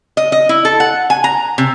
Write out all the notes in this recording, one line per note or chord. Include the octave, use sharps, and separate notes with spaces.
D#5
D#5
E4
A4
F#5
G#5
A#5
C3